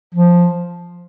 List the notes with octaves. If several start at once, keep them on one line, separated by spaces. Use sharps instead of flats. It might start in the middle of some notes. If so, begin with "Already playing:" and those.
F3